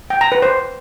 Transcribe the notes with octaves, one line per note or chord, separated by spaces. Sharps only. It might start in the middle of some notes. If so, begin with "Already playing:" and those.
G5
A#5
B4
C5